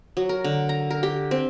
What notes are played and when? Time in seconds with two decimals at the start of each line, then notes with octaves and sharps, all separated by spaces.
0.17 F#3
0.29 A#4
0.44 D3
0.69 A#5
0.90 A#4
1.03 G4
1.31 C4